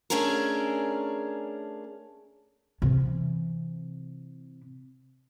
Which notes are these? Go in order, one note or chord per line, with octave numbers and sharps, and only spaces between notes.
A3 C#4 D4 G#4 A#4
C3 E3